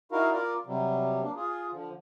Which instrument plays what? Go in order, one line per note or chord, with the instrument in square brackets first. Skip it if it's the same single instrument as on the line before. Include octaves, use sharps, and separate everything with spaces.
[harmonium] D#4 E4 F#4 A#4 F5
F4 A#4 D5
C3 F#3 G3
A#3 D4
F4 G#4
D3 F3